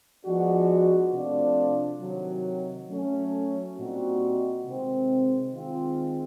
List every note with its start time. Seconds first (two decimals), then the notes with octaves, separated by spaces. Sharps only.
0.24 F3 G#3 B3 D4 F#4
1.12 C3 F3 A3 D4
2.00 C3 D#3 F#3
2.89 F#3 A3 C#4
3.77 A#2 G3 C4 D#4 F#4
4.66 C3 D#3 G#3 C4
5.54 D#3 G#3 C4 F4